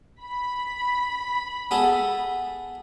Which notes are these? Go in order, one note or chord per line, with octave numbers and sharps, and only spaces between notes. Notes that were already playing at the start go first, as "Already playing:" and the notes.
B5
B3 G#4 A4